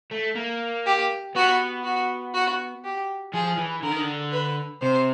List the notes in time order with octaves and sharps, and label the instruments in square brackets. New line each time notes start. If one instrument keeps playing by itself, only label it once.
[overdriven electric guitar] A3
A#3
[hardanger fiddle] G4
[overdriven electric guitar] B3 [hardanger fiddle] F#4
[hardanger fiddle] F#4
F#4
G4
[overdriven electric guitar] F3 [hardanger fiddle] G#4
[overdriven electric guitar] E3
[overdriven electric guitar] D3 [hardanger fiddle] A#4
[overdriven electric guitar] D#3
D3
[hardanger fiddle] B4
[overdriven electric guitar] C3 [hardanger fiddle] C5